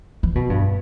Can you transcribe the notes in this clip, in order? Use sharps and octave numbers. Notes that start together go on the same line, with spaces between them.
E3
B2
G2